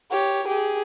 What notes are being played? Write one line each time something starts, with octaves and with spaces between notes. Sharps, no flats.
G4 C#5
G4 G#4